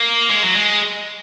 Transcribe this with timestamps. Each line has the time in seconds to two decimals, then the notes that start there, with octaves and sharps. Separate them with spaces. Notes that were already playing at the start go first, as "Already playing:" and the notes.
Already playing: A#3
0.30 G#3
0.43 F#3
0.54 G#3